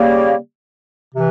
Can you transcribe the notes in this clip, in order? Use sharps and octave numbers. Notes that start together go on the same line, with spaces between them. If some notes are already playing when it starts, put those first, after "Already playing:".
Already playing: C#3 G3 A#3
C3 E3